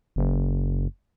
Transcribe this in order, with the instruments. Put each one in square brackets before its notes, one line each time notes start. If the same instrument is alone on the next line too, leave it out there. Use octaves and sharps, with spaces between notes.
[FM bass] F#1